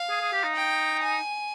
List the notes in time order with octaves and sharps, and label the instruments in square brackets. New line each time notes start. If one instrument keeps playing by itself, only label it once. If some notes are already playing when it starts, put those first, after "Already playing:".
Already playing: [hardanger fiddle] F5
[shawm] G#4
G#4
G4
D#4
[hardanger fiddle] G5
G#5